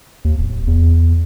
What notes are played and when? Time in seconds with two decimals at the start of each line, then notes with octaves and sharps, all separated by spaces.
0.25 D#2
0.39 D1
0.67 E2